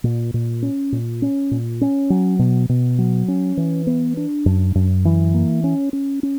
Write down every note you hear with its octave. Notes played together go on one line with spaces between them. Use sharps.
A#2
A#2
C#4
A#2
C#4
A#2
C#4
F#3
B2
B2
F#3
C#4
E3
B3
D4
F#2
F#2
E3
A#3
C#4
C#4
C#4